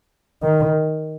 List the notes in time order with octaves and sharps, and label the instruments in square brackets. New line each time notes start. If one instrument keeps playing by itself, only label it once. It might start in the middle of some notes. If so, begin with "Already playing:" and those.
[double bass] D#3